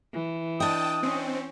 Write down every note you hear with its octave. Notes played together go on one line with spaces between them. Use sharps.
E3
D4 D#5 G5 A5 D#6
C4 C#4